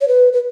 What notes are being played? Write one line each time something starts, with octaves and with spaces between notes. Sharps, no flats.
C#5
B4
B4